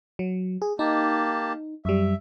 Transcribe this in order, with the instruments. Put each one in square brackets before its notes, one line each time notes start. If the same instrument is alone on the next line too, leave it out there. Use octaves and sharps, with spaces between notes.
[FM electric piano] F#3
G#4
[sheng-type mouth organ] A#3 G4 A5 [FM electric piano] D#4
[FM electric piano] F#2 G3 [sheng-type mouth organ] E5